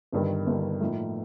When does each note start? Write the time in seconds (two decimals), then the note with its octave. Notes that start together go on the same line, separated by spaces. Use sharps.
0.12 G1 G2 D#3
0.47 G1 G2 D#3
0.81 A2 F3 A#3 D#4